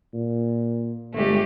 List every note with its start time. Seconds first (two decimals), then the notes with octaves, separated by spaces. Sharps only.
0.14 A#2
1.13 G1 G#3 A3 G4